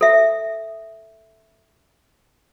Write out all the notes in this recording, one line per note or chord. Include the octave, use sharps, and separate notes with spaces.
A4 E5